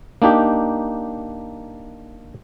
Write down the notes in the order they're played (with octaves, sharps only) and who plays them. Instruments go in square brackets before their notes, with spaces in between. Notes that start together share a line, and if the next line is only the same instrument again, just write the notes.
[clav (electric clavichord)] A#3 D4 D#4 G4